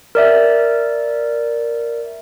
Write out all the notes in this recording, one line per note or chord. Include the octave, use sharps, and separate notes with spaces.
A#4 D5 E5